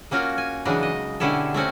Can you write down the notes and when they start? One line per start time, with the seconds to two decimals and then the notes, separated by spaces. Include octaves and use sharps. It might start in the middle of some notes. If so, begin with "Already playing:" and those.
0.11 A#3 C#4 F4 F#4 A#4
0.38 G#5
0.65 C#3 E3 F#3 G#3 D4 D#4
0.83 D#5
1.20 B2 D3 C#4 E4 G4 A4
1.54 A3 C4 C#4 F#4